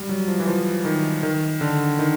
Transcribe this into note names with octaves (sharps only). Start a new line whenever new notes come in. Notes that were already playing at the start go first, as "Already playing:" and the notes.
Already playing: G3
F#3
F3
E3
F3
D#3
D#3
D3
D#3